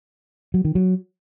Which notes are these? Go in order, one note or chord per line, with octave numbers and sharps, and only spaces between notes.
F#3
D#3
F#3